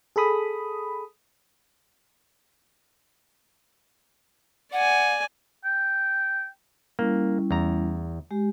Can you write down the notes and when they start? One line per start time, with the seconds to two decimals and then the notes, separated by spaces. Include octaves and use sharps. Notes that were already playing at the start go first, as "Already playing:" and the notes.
0.16 G#4 A4 B5 D#6
4.73 D5 F#5 G#5
5.65 G5
6.99 G3 A#3 C#4 E4
7.51 E2 A#5
8.31 G#3 G4